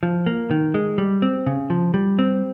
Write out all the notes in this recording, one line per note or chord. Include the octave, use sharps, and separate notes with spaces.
F3
A#3
D#3
G#3
G3
C4
C#3
F3
G3
C4